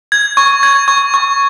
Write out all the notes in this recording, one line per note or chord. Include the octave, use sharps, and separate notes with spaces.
G#6
C#6
G#6
C#6
C#6